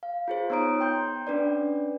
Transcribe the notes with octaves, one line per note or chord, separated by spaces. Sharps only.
F5
F4 G#4 C5
B3 D#4 C#5 A#5 D#6 D7
G5 C6 G6
C#4 D4 B4 D5